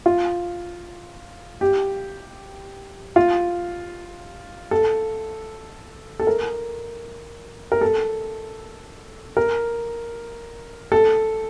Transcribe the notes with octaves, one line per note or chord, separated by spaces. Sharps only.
F4
G4
F4
A4
A4
A#4
A#4
A4
A#4
A4